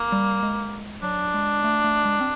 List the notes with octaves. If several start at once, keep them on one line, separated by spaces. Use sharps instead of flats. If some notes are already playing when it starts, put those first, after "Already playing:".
Already playing: A#3
G3
G#3
F#3 D4
G#3
A3
A3
G#3
C4